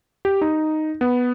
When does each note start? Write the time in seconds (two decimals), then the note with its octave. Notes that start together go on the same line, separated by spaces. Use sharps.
0.25 G4
0.41 D#4
1.01 B3